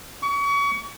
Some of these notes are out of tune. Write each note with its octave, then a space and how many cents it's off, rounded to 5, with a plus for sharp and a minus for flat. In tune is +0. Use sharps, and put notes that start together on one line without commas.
C#6 +35